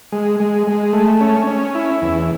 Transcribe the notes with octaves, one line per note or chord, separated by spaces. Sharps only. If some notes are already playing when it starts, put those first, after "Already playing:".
G#3
G#3
G#3
A3
C#4
C#4
E4
E2